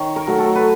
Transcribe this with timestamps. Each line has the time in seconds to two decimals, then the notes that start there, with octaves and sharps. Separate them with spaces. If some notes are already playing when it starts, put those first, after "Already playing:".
Already playing: D#3 C#5
0.16 A#4
0.27 F#3 A3
0.38 A4
0.55 B4